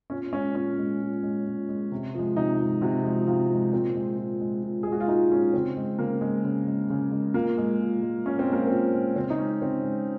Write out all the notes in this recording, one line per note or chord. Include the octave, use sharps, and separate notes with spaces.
A#2 C#4
G#3 C#4
A#2 C#4
G#3
A#2
G#3
A#2
G#3
C3
F3 G#3
C3 D#4
F3 G#3
C3 F#4
F3 G#3
C3 F4
F3 G#3
A#2 C4
G#3
A#2
G#3
A#2
G#4
G#3
F#4
F4
A#2 D#4
G#3 C#4
C#3 C4
G#3
C#3 A#3
G#3
C#3
G#3
C#3
G#3
A#2 A#3
G#3
A#2
G#3
A#2 C#4
C4
G#3 A#3
A#2 C4
G#3
C#3 C4
D#4
G#3 C#4
C#3 C4
G#3